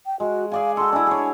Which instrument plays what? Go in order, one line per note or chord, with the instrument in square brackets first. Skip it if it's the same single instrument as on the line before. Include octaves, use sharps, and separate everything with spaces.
[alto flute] G5
[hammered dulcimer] G#3 [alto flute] F#4
[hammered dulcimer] G#4 D5 G#5 [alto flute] F5
[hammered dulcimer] F#4 A4 [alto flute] C6
[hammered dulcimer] D4 E4 [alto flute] G#5
[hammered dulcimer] G#4 C#5